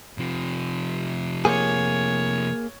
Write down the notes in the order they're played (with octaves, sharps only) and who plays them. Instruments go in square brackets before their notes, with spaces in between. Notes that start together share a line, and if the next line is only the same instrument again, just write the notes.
[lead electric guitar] C3 F3
[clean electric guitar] A#3 G#4 [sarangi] C#5